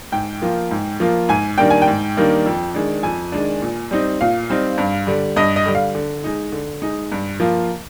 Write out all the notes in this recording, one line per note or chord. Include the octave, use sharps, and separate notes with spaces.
G#2 G5
F3 A#3 F4
G#2
F3 A#3 F4
G#2 G#5
D#3 G3 A#3 D4 G5
G#5
G5
G#2
D#3 G3 A#3 D4
F2
D#3 G#3 D4
F2 G#5
D#3 G#3 D4
A#2
G3 C4 D#4
A#2 F5
G3 C4 D#4
G2
D3 G3
G2 D#5
D#5
D3 G3
F5
D3
G#3 D#4
D3
G#3 D#4
G2
F3 A#3 F4